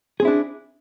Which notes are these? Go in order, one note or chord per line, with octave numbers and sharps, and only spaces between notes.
C4 D4 E4 G#4